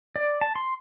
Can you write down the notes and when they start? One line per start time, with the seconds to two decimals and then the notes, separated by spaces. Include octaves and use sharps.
0.16 D5
0.41 A5
0.56 C6